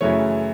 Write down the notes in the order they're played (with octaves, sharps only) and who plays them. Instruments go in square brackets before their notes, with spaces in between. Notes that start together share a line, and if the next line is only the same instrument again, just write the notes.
[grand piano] F#2 C#3 E3 A3 C#5